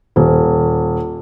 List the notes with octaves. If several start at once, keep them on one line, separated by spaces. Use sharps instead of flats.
D#1